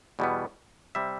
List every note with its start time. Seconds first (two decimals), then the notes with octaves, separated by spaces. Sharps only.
0.19 E2 B2 G3 B3
0.95 C3 G3 E5